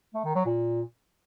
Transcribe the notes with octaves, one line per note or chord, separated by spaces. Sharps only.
A3
D#3
F#3
A#2